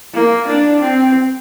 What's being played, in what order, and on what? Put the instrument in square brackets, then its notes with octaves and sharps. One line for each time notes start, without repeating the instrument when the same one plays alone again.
[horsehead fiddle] A#3
D4
C4